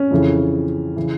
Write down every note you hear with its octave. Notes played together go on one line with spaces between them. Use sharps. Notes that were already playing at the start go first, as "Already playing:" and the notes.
Already playing: C#4
F2 C#3 E3
C#3 E3